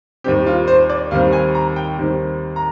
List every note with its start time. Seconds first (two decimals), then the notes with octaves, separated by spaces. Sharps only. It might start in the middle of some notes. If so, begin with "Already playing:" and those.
0.24 D#2 D#3 G3 C4 G4
0.46 F4
0.67 C5
0.89 D5
1.11 D#2 D#3 G3 C4 F5
1.33 G#5
1.55 A#5
1.76 G5
1.98 D#2 D#3 G3 C4
2.56 A#5